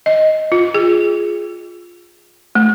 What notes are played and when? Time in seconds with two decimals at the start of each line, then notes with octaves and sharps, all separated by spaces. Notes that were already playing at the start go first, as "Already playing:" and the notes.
0.06 D#5
0.52 F4
0.74 G#4
2.55 A3